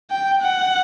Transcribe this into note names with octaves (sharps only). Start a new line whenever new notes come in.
G5
F#5